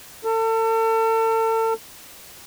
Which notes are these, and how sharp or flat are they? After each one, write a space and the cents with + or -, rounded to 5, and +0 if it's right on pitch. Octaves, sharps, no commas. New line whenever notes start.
A4 +35